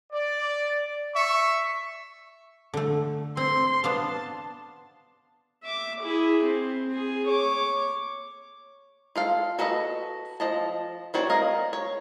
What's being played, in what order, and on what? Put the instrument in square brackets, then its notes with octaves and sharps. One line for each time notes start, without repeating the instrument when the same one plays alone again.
[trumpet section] D5
E5 C#6
[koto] D3 A3
[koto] C4 [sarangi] C6
[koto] B3 D4 F5 [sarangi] A5
[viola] E5 D6
E4 G#4
C4
G#4
C#5 D6
[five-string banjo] F4 A4 F5
F#4 A4 B4 D#5
F3 D#5 A5
C4 F#4 C#5 D5
A#4 D#5 F5
C#5